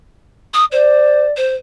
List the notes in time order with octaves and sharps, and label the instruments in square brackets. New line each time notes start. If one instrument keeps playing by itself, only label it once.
[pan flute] D#6
[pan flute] C5 [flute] D5
[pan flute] C5